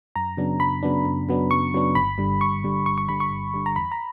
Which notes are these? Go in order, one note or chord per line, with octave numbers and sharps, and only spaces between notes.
F#2 A#5
C#3 F#3 B3 D4
F#2 B5
C#3 F#3 B3 D4
F#2
C#3 F#3 B3 D4
F#2 C#6
C#3 F#3 B3 D4
G1 B5
G2 D3 G3
G1 C#6
G2 D3 G3
G1 C#6
C#6
G2 D3 G3 B5
C#6
G1
G2 D3 G3
A#5
E2 B5
A#5